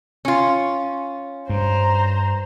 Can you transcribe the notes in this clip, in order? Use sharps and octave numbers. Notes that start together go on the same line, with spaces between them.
C#4 F4
G2 C5 A#5